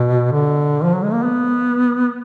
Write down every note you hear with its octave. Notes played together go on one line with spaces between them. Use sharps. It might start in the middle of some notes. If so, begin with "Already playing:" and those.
Already playing: B2
D3
F3
F#3
G#3
A#3
B3